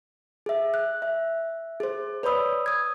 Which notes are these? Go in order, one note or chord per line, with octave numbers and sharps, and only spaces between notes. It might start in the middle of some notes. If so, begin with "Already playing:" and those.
G#4 E5
F#6
E5
G#4 C5
B4 C#5 D5 B5 D#6 E6
D#6 G#6